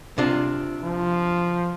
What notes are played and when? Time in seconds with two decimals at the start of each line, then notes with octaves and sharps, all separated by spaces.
0.18 C3 D4 F4
0.84 F3